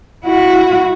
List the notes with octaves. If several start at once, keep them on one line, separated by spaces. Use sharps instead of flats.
E4 F#4